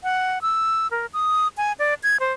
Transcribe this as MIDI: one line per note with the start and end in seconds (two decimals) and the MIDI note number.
0.03 0.39 78
0.42 0.87 88
0.91 1.06 70
1.13 1.48 87
1.57 1.73 80
1.79 1.94 74
2.03 2.17 92
2.20 2.33 72